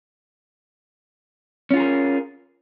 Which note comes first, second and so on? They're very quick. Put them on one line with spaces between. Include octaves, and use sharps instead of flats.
C#4 F4 G#4 A#4